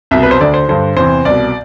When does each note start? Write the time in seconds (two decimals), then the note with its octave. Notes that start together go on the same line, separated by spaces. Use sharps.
0.11 C2 B2 E5
0.23 B4
0.31 C5
0.40 D2 D3 D5
0.54 C5
0.69 G2 D3 C5
0.97 E2 C3 E3 C5
1.25 C2 B2 D5